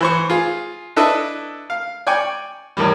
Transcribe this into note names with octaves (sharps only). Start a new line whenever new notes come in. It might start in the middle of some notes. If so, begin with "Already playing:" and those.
E3 C5 C#6
F4 G#4
D4 E4 A4 B4 D#5 E5
F5
D5 G5 G#5 C#6
E2 A2 D#3 G3